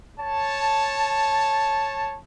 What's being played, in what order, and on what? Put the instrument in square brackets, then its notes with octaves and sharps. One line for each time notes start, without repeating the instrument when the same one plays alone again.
[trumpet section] C#5 A5